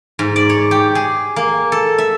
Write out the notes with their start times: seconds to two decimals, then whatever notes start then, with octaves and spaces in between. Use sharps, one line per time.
0.19 G#2
0.36 D5
0.50 C#5
0.71 G4
0.95 G#4
1.36 A#3
1.72 A4
1.98 E5